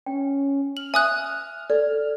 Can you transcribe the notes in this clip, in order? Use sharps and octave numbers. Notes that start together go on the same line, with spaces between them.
C#4 G5
F6 F#7
E5 G#5 D#6 F#6
A4 D5